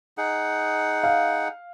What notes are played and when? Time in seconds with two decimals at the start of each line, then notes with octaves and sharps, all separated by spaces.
0.18 D#4 G#4 F#5
1.04 F5